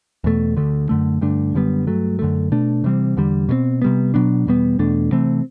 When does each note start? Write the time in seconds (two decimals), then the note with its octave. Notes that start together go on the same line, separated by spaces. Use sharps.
0.24 E2 B2 A3
0.57 D2 D3 A3
0.89 F#2 D3 A3
1.21 G2 D3 A3 D4
1.54 F#2 D3 G3 B3
1.87 G2 F#3 A3
2.19 F#2 D3 A3
2.52 B2 A3 D4
2.84 C3 E3 G3 C4
3.17 E2 D3 G3
3.49 B2 A3 C4
3.82 C3 G3 B3
4.14 B2 F#3 B3 D4
4.47 E2 B2 G3 B3
4.79 E2 B2 A3 D4
5.12 C3 E3 A3 C4